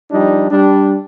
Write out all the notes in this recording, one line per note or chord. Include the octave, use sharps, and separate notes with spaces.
F3 G3 D4 D#4
G3 D4